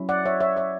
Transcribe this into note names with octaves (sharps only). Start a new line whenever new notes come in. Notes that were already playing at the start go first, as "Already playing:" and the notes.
Already playing: F#3 C#4 E4
D5 F#5
C#5 E5
C#5 E5
C#5 E5